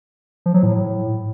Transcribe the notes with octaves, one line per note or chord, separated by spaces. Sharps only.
F3
F#3
A2